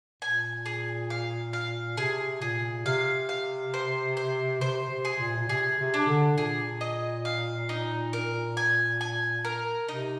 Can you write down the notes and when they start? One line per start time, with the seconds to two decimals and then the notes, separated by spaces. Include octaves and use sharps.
0.22 A#2 G#5
0.66 G#4
1.10 F5
1.53 F5
1.97 C3 G#4
2.42 A#2 G#4
2.86 C3 F5
3.29 F5
3.74 C5
4.17 C5
4.61 C3 C5
4.90 C3
5.05 G#4
5.20 A#2
5.38 A#2
5.49 C3 G#4
5.79 C3
5.94 D4
6.07 D3
6.37 A#2 G#4
6.81 D#5
7.25 F5
7.69 D#4
8.13 A#4
8.57 G#5
9.01 G#5
9.45 A#4
9.88 C3 D#4